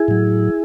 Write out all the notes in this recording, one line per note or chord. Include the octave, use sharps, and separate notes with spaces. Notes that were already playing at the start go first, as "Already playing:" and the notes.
Already playing: E4 G#4
A2 F#3